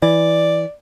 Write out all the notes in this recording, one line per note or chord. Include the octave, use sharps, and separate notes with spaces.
E3 D5